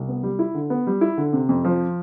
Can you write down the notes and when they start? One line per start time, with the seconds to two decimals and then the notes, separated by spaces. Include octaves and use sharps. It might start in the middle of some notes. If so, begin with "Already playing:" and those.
Already playing: C2
0.08 B3
0.23 G3
0.39 E4
0.55 D3
0.70 B3
0.87 G3
1.01 E4
1.17 D3
1.33 C3
1.49 F2
1.64 F3